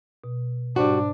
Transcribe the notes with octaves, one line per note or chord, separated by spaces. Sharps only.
B2
G#2 G3 D4 F#4 C5